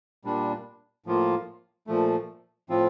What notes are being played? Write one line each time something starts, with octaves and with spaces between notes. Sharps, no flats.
A#2 G3 D4
A2 F3 A#3 F4
A#2 F3 A3
A2 F3 C4 F4